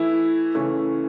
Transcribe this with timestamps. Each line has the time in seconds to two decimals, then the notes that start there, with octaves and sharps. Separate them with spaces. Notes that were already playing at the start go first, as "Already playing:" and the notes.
Already playing: E3 A3 E4
0.55 C#3 E3 A3 C#4